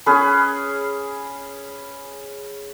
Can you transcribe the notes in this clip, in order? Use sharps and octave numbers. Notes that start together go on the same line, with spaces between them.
C#4 G#4 B4